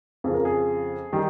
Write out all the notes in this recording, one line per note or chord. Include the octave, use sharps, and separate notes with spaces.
F2 C#3 F3 G#4
A#4
G#4
D#3 G3